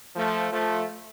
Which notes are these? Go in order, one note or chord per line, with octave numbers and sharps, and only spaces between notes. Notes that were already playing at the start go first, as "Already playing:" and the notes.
F3 A3
F3 A3